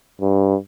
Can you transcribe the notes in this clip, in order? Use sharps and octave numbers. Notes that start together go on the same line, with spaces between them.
G2